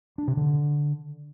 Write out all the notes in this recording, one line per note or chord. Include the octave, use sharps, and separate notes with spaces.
D4
C3
D3